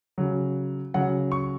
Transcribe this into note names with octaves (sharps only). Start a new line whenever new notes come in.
C#3 F#3
C#3 F#3 F#5
C#6